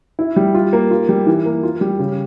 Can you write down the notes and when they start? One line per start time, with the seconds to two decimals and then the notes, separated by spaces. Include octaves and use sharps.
0.19 E4
0.36 G3
0.55 F4
0.73 A#3
0.91 F4
1.09 G3
1.27 E3
1.45 A#3
1.63 F4
1.81 G3
1.99 C#3